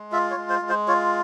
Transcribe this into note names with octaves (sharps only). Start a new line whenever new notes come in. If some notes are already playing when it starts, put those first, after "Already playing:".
Already playing: G#3
F4 E5
C#5
G#3
C5
G#3
C5
F4 C#5